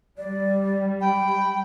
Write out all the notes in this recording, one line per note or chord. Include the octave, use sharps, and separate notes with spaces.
G3 D5
G5 B5